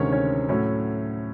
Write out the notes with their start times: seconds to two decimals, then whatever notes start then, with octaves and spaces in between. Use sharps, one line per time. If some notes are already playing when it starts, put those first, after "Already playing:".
Already playing: D2 C3 D#3 G#3 C#4 C#5
0.12 C#4 C#5
0.49 A2 F#3 A3 C#4 C#5